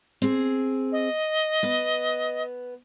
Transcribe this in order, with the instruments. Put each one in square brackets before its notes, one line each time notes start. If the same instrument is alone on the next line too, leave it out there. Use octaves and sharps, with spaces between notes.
[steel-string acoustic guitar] C4 G#4
[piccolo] D#5
[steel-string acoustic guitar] B3 B4